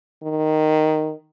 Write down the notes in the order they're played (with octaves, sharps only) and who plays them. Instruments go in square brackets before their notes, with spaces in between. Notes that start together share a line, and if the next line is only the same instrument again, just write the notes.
[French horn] D#3